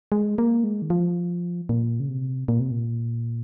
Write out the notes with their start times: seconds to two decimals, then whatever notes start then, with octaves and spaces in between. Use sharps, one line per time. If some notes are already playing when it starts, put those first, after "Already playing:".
0.12 G#3
0.38 A#3
0.64 G#3
0.82 D#3
0.90 F3
1.69 A#2
2.00 C#3
2.09 C3
2.48 A#2
2.60 C3
2.71 A#2